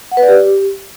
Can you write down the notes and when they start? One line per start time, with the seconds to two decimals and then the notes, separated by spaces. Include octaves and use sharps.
0.12 F#5
0.17 B4
0.23 D5
0.28 G4